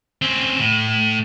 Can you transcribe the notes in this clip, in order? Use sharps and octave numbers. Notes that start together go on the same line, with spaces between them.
C4 C#4
A2